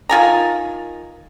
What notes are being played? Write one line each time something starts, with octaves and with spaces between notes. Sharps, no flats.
D#3 F4 G#5 A#5